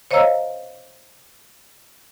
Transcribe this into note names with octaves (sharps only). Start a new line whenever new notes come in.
C5 C#5 D#5 F5 A#5 E6